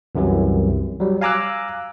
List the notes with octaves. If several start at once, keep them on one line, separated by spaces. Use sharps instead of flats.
C2 F#2 C3 E3 F#3
F#3 G3
F5 G#5 A#5 D6 E6 F#6